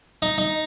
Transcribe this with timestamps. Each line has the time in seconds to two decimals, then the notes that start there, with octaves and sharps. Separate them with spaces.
0.22 D#4
0.38 D#4